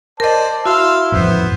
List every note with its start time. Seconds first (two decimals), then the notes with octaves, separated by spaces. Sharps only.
0.20 A#4 C5 D5 D#5 A5
0.66 E4 F#4 F5 C6 E6
1.12 A1 F2 B3 C5